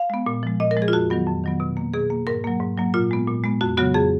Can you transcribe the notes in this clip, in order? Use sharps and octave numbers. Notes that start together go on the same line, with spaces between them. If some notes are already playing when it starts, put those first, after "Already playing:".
Already playing: F5
G#3 B3
A#2
F3 G#3
A#2 D#5
A#4
F3 G#3
G#4
F4
F2 F#4
D#3 F#3 B3
F2
D#3 F#3 B3
B2
A#3
B2 G#4
A#3
G#2 A#4
F#3 A#3
G#2
F#3 A#3
A#2 F4
G#3 B3
A#2
G#3 B3
F2 F#4
C#3 F#3 B3 F#4
F2 G#4